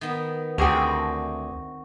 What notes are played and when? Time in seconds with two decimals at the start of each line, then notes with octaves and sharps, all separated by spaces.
0.01 D#3 B3
0.58 D2 C4 G4 G#4 A#4 F#5 G5 C#6